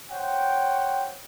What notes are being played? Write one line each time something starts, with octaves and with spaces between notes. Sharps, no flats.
C5 C#5 F#5 G5